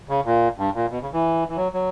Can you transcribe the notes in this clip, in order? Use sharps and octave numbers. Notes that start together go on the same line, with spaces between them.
C#3
A#2
G2
A#2
B2
C#3
E3
E3
F#3
F#3